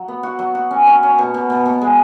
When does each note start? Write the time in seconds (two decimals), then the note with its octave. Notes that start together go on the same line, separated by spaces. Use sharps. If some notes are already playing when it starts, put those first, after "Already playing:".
Already playing: F#3
0.08 B3
0.23 F#4
0.39 F#3
0.55 F#4
0.71 C#4
0.87 C#4
1.03 C#4
1.18 B2
1.34 B2
1.50 B2
1.65 B2
1.81 G#3